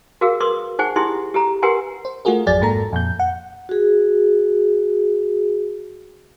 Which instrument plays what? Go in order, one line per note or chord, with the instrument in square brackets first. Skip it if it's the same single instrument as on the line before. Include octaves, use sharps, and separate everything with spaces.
[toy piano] F#4 G#4 A#4 F5 E6
A#4 B4 C6 D6 D#6
D#4 G#4 C5 F#5 G#5 C#6
D#4 E4 G4 G#4 C6 D#6
G4 A4 A#5
G4 A#4 B4 F#5 G#5 C6
[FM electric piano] C5
A3 F4 F#4 G#4 A#4
G#1 F2 F#3 G#4 D5 A6
G#2 A#3 A4 A#5
F2 A#2 G6
F#5
[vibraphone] F#4 G#4